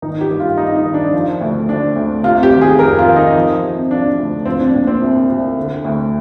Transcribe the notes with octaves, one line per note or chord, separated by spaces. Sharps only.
D#3 D#4
G4
G2
F4
G2 D#4
D#4
D#3
D4
F3
D2
D2 D4
D2
C3 F4
G4
D#3
G#4
F2 A#4
F4
D#3
D#4
F3
C3
F3 D4
D2
F3 C4
D4
A#2 D4
C4
C2
C2
D3
D2